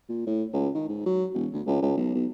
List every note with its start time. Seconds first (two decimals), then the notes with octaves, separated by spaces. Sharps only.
0.09 A#2
0.26 A2
0.53 C#2
0.74 D#3
0.88 G#2
1.06 F#3
1.33 E1
1.53 D2
1.66 C#2
1.82 C#2
1.97 B1
2.15 B1